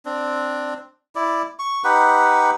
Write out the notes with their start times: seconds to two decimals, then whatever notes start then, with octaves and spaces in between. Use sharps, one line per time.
0.05 C4 D4
1.15 E4 D5
1.59 C#6
1.84 D#4 G4 B4 F#5